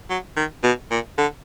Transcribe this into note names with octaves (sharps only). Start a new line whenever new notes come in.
F#3
D#3
B2
A#2
D3